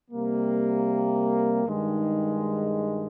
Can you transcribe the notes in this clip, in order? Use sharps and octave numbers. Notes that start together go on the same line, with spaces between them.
C3 G3 A#3
G2 D#3 G#3 D#4